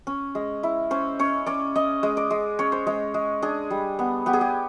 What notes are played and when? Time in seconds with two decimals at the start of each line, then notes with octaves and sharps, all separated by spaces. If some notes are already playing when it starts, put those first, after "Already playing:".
0.07 C#4
0.35 G#3
0.63 E4
0.91 C#4 C5
1.19 C#4 C#5
1.46 C#4 D5
1.75 C#4 D#5
2.03 G#3
2.17 D5
2.31 G#3
2.59 C#4 C#5
2.72 C5
2.87 G#3 C#5
3.14 G#3
3.42 D4 G#4
3.71 G3
3.99 B3
4.26 B3 G4
4.33 G#4
4.41 G4